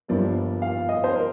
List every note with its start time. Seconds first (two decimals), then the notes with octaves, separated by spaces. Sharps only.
0.08 G1 G2 F3 A#3 D5
0.62 F5
0.89 D#5
1.04 C5
1.16 A#4